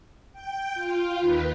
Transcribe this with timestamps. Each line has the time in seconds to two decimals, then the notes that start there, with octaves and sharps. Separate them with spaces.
0.33 G5
0.74 F4
1.19 D#2 D#3 B4